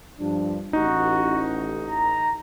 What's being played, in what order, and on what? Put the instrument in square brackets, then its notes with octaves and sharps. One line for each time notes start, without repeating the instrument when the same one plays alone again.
[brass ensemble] G2 F3 D4
[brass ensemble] A1 [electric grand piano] D#4 [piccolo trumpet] F#4
[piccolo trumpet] A#5